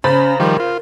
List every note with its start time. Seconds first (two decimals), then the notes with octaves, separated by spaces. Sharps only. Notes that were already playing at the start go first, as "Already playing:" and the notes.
0.04 C#3 C#4 C5 A#5 B5 A6
0.40 D#3 F3 G3 A#4
0.60 F4